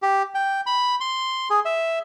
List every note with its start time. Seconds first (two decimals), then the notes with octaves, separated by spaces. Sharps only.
0.02 G4
0.35 G5
0.66 B5
1.00 C6
1.50 G#4
1.65 E5